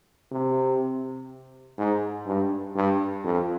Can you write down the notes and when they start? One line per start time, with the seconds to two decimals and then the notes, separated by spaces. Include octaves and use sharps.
0.32 C3
1.78 G#2
2.27 G2
2.75 G2
3.24 F2